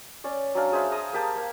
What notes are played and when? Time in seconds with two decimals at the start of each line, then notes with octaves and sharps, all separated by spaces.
0.24 C#4 D5
0.55 F#3 C#4 D4 F5
0.72 G#4 C5 E5 F5
0.92 G#4 A#5 D#6
1.13 A#3 G4 A5
1.36 A#3